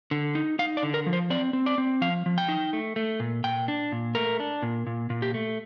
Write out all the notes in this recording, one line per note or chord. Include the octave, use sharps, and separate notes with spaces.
D3
D#4
D#4 F5
D5
D3
A#4
F3
C5
C4 D5
C4
D5
C4
F3 F5
F3
G5
D#4
A3
A3
A#2
A#2 G5
D4
A#2
A3 A#4
D4
A#2
A#2
A#2
G4
A3